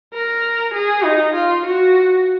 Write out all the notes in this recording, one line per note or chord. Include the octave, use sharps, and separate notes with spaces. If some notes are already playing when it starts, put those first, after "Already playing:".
A#4
G#4
D#4
F4
F#4